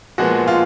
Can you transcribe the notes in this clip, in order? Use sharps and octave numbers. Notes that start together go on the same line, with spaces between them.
A#2 F3 G#3 B3 F#4
F4